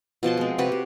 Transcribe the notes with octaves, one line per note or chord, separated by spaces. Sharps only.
B2 F3 A5 C6
G#3 C4
C3 F#4 G4 B4
C3